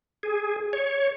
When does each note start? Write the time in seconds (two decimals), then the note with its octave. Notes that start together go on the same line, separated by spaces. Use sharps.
0.23 G#4
0.73 C#5